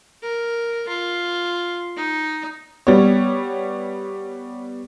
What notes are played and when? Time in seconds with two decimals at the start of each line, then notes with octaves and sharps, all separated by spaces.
0.22 A#4
0.88 F4
1.97 D#4
2.87 G3 B3 C#5